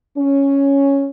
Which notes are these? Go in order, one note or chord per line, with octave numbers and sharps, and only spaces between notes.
C#4